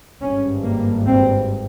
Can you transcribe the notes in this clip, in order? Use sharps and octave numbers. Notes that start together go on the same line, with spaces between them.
G#1 G2 C#4
A#3
C4